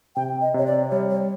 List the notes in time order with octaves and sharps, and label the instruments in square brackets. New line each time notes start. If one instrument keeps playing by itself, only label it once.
[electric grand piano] C3 [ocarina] G5
[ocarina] D#5
[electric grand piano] C3 [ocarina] C#5
[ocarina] D5
[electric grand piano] G3 [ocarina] C#5
[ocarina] C#5